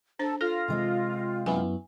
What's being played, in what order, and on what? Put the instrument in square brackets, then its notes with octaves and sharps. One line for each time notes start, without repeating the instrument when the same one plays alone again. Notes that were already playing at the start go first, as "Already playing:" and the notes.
[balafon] D4 C5 [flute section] A4
[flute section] F4 [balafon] A4 [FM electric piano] F6 A#6
[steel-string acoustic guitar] C3 G#3 C4
[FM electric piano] F#2 B3 E4 [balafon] G#5